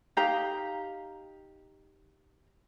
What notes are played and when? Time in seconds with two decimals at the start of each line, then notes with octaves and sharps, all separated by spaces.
0.17 D#4 G4 F5 A#5